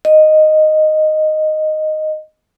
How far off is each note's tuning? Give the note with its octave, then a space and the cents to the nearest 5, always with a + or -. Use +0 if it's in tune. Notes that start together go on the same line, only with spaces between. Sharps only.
D#5 -5